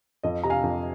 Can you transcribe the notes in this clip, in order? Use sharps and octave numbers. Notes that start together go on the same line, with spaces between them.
F2 D#5
C3 A#5
F5 G#5
F2